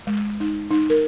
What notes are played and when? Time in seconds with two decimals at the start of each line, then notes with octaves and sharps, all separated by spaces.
0.07 G#3
0.40 D#4
0.71 D#4
0.90 A#4